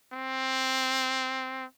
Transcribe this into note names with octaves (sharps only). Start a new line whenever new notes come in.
C4